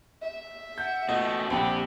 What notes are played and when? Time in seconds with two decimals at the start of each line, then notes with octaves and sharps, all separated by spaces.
0.22 E5
0.78 F#5 G6
1.09 B2 A3 D#5
1.50 A#1 C4 G4 F#5 B5